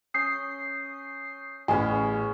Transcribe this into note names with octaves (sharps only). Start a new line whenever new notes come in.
C#4 D#6 G6 C7
A1 B3 C#4 G#4 G#5